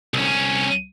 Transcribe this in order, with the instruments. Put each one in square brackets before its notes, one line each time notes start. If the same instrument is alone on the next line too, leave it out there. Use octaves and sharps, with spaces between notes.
[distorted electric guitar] C2 C#4